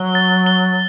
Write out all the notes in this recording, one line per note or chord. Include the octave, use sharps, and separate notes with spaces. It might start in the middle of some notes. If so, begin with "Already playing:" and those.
Already playing: F#3 G7
A6
G7